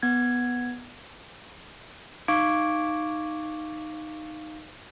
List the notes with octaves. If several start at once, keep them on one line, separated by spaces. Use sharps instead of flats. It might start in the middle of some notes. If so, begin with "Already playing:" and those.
B3 G#6
D#4 F5 C#6 D6 G#6 D7